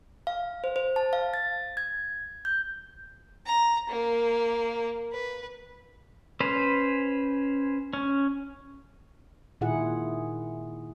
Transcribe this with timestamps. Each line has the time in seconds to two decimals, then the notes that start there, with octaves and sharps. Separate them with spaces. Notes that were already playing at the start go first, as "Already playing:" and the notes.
0.27 F5
0.64 C5
0.76 C5
0.96 A5
1.13 F5
1.34 A6
1.77 G#6
2.45 G6
3.46 A#5
3.89 A#3
5.13 B4
6.41 C#4 B4 C5
7.93 C#4
9.61 A#2 D#3 E4 F4 G#4 F#5